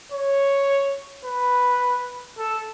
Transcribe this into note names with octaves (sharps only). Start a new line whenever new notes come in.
C#5
B4
A4